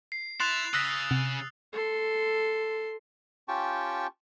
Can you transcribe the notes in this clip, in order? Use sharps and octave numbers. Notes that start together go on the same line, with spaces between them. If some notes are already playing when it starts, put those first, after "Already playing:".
C7
E4 C6 F#6 A6 F7
C#3 D#6 E6 F#6 A#6 B6
C3
A4 C6
C#4 F4 G4 G5 A5 C#6